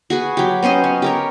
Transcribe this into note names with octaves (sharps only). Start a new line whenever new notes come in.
F#4 G#4 B4
F#3 G4
B3 C#4 C5 D#5
C#4
G4 A#4 C#5